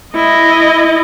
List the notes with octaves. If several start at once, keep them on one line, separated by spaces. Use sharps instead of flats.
E4 D#5